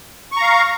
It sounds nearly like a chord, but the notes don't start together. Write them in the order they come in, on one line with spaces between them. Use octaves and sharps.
C#6 A#5 F5